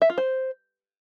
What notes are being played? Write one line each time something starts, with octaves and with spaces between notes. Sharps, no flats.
E5
F4
C5